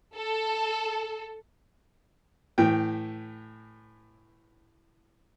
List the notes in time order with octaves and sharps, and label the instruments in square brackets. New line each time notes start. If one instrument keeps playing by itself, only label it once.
[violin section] A4
[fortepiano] A2 E3 G5